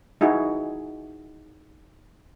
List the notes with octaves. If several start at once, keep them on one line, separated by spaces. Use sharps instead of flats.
D#4 E4 F#4 G#4